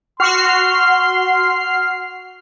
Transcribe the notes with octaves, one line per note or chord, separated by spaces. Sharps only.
F#4 C6 F6 C7